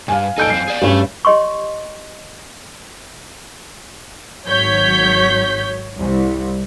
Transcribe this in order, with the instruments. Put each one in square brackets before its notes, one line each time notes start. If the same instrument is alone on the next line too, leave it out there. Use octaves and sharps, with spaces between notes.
[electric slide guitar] G2 [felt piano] F5 G#5
[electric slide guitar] F2 A#2 D#4 [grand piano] A4 G6 D7
[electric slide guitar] F#2 C4 [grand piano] C7
[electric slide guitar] G#4 D5
[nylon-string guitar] G2 [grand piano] G3 C#4 [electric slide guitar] A3
[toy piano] G4 C#5 D#5 C6 C#6
[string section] G#1 F#3 C#5 G6 B6
C2